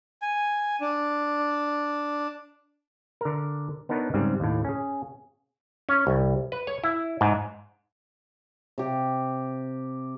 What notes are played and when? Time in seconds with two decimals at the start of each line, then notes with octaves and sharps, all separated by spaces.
0.22 G#5
0.81 D4
3.21 D3 A#4
3.89 B3 D4 D#4 A#4 B4 C#5
4.14 G#2 C#3 G3 C4
4.40 D#2 A2
4.65 C#4 G#4
5.89 C#4
6.07 C2
6.52 B4
6.67 C#5
6.84 E4
7.21 G#2
8.78 C3 G4